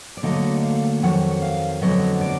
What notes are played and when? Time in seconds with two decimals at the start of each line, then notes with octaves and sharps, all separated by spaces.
0.17 D5
0.23 D2 D3 F#3 A#3 D#5
0.63 F5
1.02 F2 D#3 F#3 F#5
1.42 F5
1.81 F2 D3 F#3 B3 D#5
2.21 D5